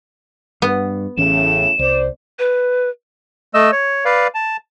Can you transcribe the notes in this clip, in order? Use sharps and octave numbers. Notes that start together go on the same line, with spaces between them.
G2 B3
A1 A2 C#3 E3 C#4 E7
C2 C5 D5
B4
A3 D#5 E6
C#5
B4 D5 F5
A5